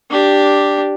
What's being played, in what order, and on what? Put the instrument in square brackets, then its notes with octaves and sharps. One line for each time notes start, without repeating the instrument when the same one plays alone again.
[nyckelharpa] D4 G4